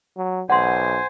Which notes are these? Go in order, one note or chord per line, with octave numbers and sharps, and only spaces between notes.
F#3
B1 C5 F#5 G#5 C6